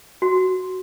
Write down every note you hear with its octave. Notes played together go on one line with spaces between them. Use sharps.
F#4